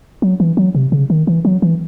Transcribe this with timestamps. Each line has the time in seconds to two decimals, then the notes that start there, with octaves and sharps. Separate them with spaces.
0.22 F#3
0.40 E3
0.57 F#3
0.75 C3
0.92 C#3
1.10 D#3
1.27 E3
1.45 F#3
1.62 E3